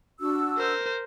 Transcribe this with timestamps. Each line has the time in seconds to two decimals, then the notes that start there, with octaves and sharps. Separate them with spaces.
0.19 D4 F#4 E6
0.58 A#4 C5